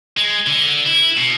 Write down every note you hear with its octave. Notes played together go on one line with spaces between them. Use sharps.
G#3
D3
E4
B2